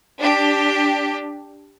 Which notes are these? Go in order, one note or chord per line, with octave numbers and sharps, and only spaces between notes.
D4 G4